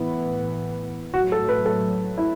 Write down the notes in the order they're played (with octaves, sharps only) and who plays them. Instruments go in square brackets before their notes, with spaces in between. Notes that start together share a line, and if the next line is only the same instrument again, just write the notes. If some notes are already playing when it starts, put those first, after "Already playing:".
Already playing: [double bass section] A2 E3 B3 [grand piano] E4
[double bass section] A2 F#3 A3 [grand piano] F#4
[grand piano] A4
B4
A4
E4